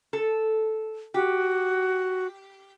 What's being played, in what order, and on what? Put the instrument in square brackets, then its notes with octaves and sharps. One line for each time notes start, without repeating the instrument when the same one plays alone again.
[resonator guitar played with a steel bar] A4
[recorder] F#4 [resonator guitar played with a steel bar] G4